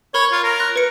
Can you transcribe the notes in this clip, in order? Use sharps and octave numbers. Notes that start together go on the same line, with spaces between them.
A#4 C#5 B5
F4
A#4
F#6
B4 C#7